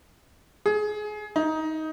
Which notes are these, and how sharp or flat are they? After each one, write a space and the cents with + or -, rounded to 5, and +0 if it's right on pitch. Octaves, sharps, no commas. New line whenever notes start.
G#4 +25
D#4 +15